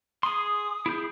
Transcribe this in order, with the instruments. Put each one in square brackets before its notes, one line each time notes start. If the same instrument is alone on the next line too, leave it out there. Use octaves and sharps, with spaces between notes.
[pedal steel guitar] G#4 C6 [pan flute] D#6
[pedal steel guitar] E4 G#4 G6